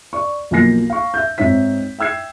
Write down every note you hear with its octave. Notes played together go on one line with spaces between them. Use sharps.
D5 C#6
B1 F3 A#3 G#5 A#6 C7
F5 C#6
E5 G6
G#2 C4 D#4 C#5 E5 B6
E5 G5 E6 G#6 C7